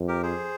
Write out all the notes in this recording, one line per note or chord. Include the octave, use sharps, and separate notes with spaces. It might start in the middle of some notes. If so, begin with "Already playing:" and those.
Already playing: F2
G4 A#4
G#4 C5